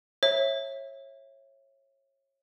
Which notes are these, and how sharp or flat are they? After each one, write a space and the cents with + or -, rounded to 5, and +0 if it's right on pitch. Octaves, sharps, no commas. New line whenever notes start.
C#5 -25 E5 +0